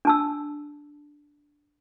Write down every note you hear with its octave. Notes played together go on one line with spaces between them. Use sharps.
D4 A5 E6